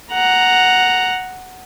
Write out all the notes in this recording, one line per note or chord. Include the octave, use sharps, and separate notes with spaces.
F#5 A#5